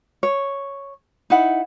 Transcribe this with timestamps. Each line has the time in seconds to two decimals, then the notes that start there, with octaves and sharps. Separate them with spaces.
0.23 C#5
1.30 D#4 E4 F#5